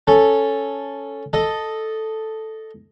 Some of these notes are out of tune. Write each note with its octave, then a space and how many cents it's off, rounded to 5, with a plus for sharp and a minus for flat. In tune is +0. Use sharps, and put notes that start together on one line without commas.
C#4 +0 A4 +0
A4 +0 D#5 +0